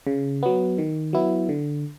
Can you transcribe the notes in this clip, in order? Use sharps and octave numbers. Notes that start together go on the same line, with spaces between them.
C#3
F#3 B3
D#3
F#3 B3 E4
D3